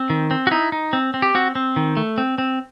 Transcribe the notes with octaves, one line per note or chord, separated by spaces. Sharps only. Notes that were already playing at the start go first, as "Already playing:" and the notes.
Already playing: C4
D#3
C4
F#4
D#4 E4
D#4
C4
C4
G4
C4 F#4
C4
D#3
A3
C4
C4